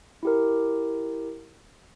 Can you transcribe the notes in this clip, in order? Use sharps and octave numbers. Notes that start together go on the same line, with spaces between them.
E4 G4 A#4